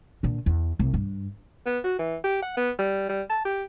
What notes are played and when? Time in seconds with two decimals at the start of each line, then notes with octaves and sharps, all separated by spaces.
0.23 A#2 D3
0.46 E2
0.79 C2
0.94 G2
1.66 B3
1.84 F#4
1.99 E3
2.24 G4
2.43 F#5
2.57 B3
2.79 G3
3.09 G3
3.30 A5
3.45 G4